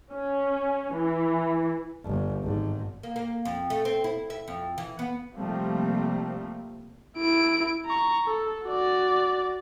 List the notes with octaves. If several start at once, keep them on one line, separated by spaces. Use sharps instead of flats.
C#4
E3
G1
G#1 G#2
A#3
A#3
F2
A3
C4
E4
E5
F2
E3
B3
C3 F3 G3 A3 A#3 C4
E4 D7
A#5 C#6
A4
F#4 D5